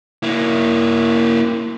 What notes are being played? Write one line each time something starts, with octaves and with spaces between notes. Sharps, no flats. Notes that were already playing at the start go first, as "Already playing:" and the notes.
A#3 E4